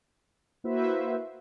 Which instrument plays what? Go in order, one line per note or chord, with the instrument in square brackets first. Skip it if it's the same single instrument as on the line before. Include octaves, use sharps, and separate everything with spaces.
[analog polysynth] A#3 E4 F#4 B4 C5 E5